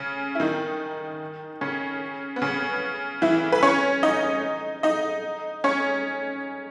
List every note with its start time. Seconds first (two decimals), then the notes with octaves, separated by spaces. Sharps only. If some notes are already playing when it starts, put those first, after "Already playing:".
Already playing: C#3 C#4
0.35 E4
0.40 D#3 D#4
1.61 C#3 C#4
2.36 B3
2.42 C#3 C#4
3.22 E3 E4
3.52 B4
3.63 C#4 C#5
4.03 D#4 D#5
4.83 D#4 D#5
5.64 C#4 C#5